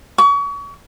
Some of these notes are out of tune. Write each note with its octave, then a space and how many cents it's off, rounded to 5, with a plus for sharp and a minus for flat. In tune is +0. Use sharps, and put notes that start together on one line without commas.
C#6 +35